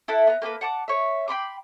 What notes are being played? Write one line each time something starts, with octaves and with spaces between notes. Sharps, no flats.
E4 A4 E5 F#5
B3 A#5
A#3 G4 A4 B4
F#5 A5 D6
C#5 E5
G5 B5 C6 D6